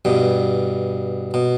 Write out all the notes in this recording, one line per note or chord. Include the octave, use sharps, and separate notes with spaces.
G2 B2
B2